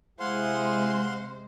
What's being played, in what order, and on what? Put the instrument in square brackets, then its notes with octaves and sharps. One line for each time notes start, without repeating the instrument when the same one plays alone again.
[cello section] C3 G#3 [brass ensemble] E4 G#4 [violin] C5 [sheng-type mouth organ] F5 F#5 C6